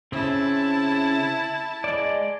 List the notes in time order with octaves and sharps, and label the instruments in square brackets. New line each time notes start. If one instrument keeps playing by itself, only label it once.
[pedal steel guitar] C#3 C4 [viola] E4 A5
[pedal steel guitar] G#3 D5